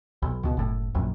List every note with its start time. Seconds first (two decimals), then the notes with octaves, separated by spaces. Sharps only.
0.22 B1
0.43 C#2 B2
0.57 F#1 A2
0.95 A#1 F#2